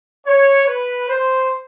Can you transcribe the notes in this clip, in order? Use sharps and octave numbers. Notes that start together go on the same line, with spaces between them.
C#5
B4
C5